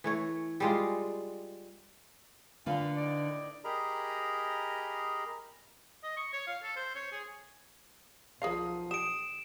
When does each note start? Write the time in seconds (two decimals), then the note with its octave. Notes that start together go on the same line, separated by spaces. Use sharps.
0.04 E3 A3 C#5
0.60 G3 G#3 F4
2.66 A#2 D3 F4 B4 F5
2.97 A2 D#4 D5
3.64 G4 G#4 A#4 D#5 A#5 B5
6.03 D#5
6.17 C#6
6.33 C#5
6.47 F5
6.63 A4
6.76 C5
6.95 C#5
7.12 G#4
8.42 B1 F3 G#4 A#4 F5 D#6 C7
8.91 G4 D#6 D7 E7